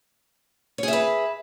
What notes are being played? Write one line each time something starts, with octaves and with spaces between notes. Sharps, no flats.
G#4 B4 C#5 E5